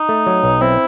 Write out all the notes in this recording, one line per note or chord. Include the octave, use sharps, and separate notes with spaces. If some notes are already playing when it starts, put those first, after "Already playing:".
Already playing: D#4
A3
F#3
B1
C4 E4